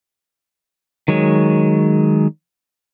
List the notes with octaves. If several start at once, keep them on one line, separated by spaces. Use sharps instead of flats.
D#3 F#3 G#3 C#5